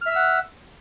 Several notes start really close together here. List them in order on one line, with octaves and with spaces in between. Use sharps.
F6 E5 E6 F#5